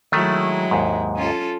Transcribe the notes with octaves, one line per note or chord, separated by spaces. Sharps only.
D#3 F#3 G#3 A3 E4
D#2 G#2
C#4 F4 A4